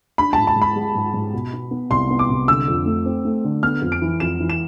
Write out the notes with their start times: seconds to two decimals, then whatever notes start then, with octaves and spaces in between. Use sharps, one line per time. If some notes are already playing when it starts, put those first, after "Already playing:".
0.18 D4 B5
0.33 G#2 A5
0.47 A5
0.56 G#2
0.62 B5
0.76 G#3
0.95 G#2
1.14 G#2
1.34 B2
1.53 B3
1.71 B3
1.90 C2 C6
2.10 B3
2.19 D6
2.30 C2
2.48 D3 E6
2.68 F2
2.86 A3
3.06 C4
3.25 A3
3.44 D3
3.63 B3 F6
3.82 F2
3.92 D7
4.01 E3
4.20 F2 E7
4.40 E3
4.50 E7